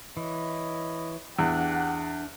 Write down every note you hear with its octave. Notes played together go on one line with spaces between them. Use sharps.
E3 C#5 D#5 B5
E2 D4 G4 F#5 E6